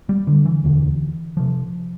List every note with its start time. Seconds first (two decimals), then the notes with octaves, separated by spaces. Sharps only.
0.09 G3
0.27 D3
0.45 E3
0.64 E1 D2 D3
1.37 C3 F3